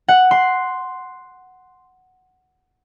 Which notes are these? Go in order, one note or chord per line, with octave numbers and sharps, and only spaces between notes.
F#5
C6